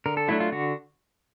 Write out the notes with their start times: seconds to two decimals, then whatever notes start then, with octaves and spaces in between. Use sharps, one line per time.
0.06 D3 A#4
0.17 A4
0.28 F#3 A3 D4 E4
0.40 F4
0.52 D3 F#4